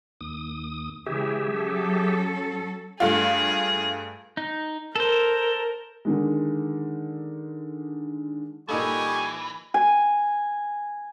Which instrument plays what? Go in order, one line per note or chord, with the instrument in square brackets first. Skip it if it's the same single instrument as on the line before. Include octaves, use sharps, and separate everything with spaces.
[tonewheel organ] D#2 D#6
[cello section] C#3 E3 G#3 [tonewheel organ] G4 G#4 E5
[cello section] F#3 C#4 A4
[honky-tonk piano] G2 A3 F4 [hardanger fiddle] G#4
[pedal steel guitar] D#4
[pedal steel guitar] A4 C5 [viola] A#4
[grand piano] D3 D#3 G#3
[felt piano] A#2 D#4 A4 [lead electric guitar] E3 [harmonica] G3 D#5 C#6 [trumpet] G#5
[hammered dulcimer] G#5